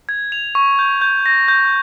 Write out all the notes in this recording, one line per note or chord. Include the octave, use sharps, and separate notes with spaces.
G#6
F7
C#6
G6
G6
A#6
G6